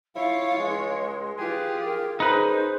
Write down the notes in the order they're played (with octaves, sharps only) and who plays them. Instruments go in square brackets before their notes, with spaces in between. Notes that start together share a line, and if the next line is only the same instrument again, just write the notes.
[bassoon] E4 [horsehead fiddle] F4 C#5 [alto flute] F5
[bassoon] C#2 [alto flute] G#3
[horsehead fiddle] F4 G4 [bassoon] G#4 [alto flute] B4
[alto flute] A#4
[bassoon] F#2 [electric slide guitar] D#4 B4 [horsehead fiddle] G#4 [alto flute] C5